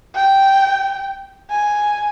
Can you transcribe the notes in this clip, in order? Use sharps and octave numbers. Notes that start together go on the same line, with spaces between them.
G5
G#5